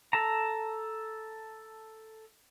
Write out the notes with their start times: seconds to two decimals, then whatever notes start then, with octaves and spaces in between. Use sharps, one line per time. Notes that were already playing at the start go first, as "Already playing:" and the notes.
0.13 A4 A5 A#5